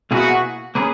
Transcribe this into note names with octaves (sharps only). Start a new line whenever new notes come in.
B2 A#3 E4 F#4 G#4 B4
A#3 C#4 G#4 B4